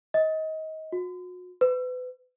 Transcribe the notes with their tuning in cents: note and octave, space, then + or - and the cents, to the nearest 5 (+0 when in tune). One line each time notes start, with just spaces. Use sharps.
D#5 +25
F#4 -35
B4 +30